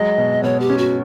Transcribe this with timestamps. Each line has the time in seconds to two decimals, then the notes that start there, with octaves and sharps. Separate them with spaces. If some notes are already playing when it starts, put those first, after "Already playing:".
Already playing: F#3 G#3 D#5
0.18 B2
0.43 B2 C#5
0.60 G4
0.70 C#4
0.78 F#4